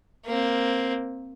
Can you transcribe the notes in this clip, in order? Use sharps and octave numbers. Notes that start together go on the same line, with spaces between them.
A#3 C4